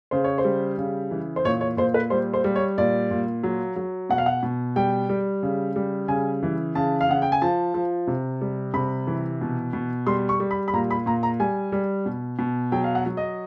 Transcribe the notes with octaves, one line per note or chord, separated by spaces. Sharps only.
C#3 C5
C#5
C5
G3
C#3
E3
C5
A#2 C#5
C#5
A#2 C5
B4
G3 C5
C5
G3
C#5
A#2 D5
A#2
F#3
F#3
B2 F#5
F5
F#5
B2
G3 G5
G3
C#3
G3
C#3 G#5
E3
C#3 A5
F5
C#3 F#5
G5
G#5
F3 A5
F3
C3
G3
C3 B5
E3
B2
B2
G3 C6
C#6
G3
B5
B5
A#2 A#5
B5
A#2 A#5
A#5
G3 G#5
G3
B2
B2
F#3 G5
F5
F#5
F#3
D#5